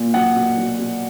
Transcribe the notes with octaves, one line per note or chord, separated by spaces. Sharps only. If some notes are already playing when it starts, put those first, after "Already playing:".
Already playing: A#2
F#3 F#5
B2
F#3
B2